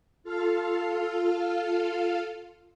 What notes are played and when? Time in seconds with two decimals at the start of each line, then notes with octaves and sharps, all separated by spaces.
0.24 F4 A4 F5